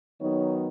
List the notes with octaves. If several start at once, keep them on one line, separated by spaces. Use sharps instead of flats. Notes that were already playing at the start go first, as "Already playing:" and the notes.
D#3 F#3 B3 D#4 C#5